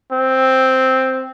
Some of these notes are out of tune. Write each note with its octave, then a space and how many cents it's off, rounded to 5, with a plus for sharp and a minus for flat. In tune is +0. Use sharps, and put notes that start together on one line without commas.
C4 +0